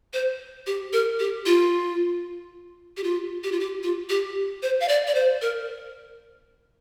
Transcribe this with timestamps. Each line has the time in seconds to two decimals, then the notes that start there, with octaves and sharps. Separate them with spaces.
0.13 C5
0.67 G4
0.93 A#4
1.19 G4
1.46 F4
2.97 G4
3.04 F4
3.44 G4
3.52 F4
3.60 G4
3.83 F4
4.09 G4
4.63 C5
4.80 F5
4.88 D5
5.07 D5
5.15 C5
5.42 A#4